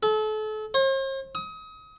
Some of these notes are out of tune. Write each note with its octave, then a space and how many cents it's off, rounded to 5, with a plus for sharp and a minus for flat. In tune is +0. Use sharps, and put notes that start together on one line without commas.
A4 -35
C5 +45
D#6 +30